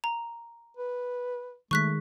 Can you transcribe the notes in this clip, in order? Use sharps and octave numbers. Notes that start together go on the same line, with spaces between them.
A#5
B4
D#3 G#3 A3 C#6 F#6 B6